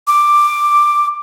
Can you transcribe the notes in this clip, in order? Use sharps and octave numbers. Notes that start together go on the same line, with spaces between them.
D6